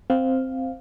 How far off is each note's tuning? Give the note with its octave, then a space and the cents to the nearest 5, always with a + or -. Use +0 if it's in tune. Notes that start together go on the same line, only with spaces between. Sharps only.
C4 +0 F5 +0